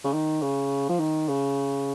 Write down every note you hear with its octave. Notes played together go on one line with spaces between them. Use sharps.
C#3
D#3
C#3
F3
D#3
C#3